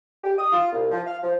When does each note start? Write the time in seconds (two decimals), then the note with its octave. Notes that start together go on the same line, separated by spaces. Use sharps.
0.24 G4
0.39 D#6
0.52 F4
0.72 C2
0.91 F3
1.07 F5
1.23 F3